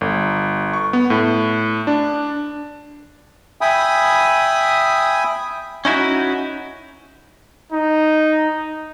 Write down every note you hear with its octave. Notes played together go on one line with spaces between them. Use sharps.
G1
C#6
B3
A2
D4
E5 G5 G#5 B5 D#6
C#4 D#4 E4 F#4
D#4